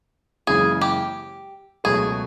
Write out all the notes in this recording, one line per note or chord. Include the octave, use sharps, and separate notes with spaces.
F#1 F#2 C#3 E3 G#3 G#4
G4
C#2 B2 F#3 A3 G#4